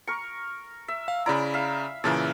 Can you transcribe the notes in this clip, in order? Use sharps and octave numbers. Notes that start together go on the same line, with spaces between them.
A#4 C#6
E5
F5
C#3 E4 D5 A#5 B5
E5 F5
A#2 C#3 E3 A#4 E5 A5